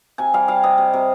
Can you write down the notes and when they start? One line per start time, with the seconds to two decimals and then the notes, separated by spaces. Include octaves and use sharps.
0.18 C3 G#5
0.34 G3 F5
0.48 G3 F5
0.63 C3 D#5
0.78 C3
0.93 C3